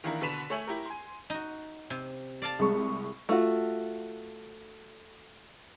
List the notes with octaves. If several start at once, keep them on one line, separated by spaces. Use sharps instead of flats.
D#3 E3 A#3 D4 E4 A#4
B2 D3 B4 B6 E7 F7
A3 C#5 E5 G#5 F#7
E4 G4 A#4
G#5 C6
D#4 F#4
C3
D5 F5 A5
C2 G#3 C#6
A3 F4 F#4